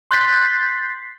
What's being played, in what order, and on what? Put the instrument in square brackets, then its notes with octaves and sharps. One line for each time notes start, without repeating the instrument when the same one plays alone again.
[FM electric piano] C6 F#6 G6 A6 B6 C7